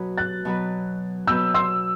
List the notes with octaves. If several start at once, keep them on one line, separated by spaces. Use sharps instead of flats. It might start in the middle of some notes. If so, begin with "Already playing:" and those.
Already playing: B2 F#3 B3 F#4 B4
F#6 A6
B2 F#3 B3 F#4 B4
B2 F#3 B3 F#4 B4 E6 G6
C6 E6